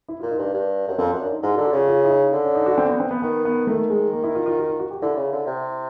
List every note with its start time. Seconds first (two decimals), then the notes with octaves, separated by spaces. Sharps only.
0.08 E4
0.20 F4
0.23 A#2
0.31 D#4
0.38 G2 D4
0.54 G2
0.88 F#2
0.98 F2 C4
1.09 C#4
1.13 F#2
1.21 D4
1.31 D#4
1.43 G#2 E4
1.54 F#4
1.58 D3
1.65 F#4
1.72 C#3 F4
1.88 F4
2.05 E4
2.10 D#4
2.33 D3
2.44 C#4
2.55 D#4
2.66 F#4
2.78 C4
2.89 B3
3.00 C4
3.11 B3
3.22 D#3 B3
3.45 B3
3.67 D#3 A3
3.90 G#3
4.13 A#3
4.24 E4
4.35 F4
4.46 F4
4.57 F#4
4.69 F4
4.79 F#4
4.91 G4
5.02 D3 E4
5.17 C#3
5.32 D3
5.47 C3